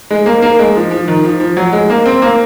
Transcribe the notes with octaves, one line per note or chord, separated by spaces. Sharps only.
G#3
A#3
A#3
G#3
F3
F3
D#3
F3
F3
F#3
G#3
A#3
C4
A#3